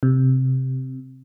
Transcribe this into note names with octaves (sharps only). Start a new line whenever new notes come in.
C3